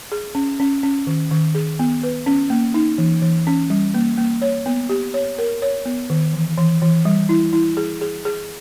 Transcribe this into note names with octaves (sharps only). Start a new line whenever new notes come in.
G#4
C#4
C#4
C#4
D#3
D#3
G#4
B3
B4
C#4
A#3
D#4
E3
E3
C#4
G3
A#3
A#3
C#5
B3
G4
C#5
A#4
C#5
B3
D#3
E3
E3
E3
G3
E4
E4
G#4
G#4
G#4